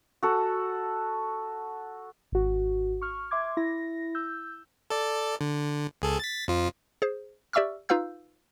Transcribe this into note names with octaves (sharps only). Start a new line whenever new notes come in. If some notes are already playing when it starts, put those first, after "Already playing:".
F#4 A4
G#1 F#4
C#6 F6
E5 C6 D6 G#6
E4 A#6
E6 G6
A4 D5
D3
C#2 G#4 A4
A6 B6
F2 F3 F4
G#4 C5
G4 D5 E5 C#6 E6 F6
D#4 F4 B4 F5 E6 G6